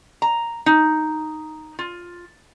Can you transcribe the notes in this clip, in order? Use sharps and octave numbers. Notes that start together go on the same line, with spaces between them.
A#5
D#4
F4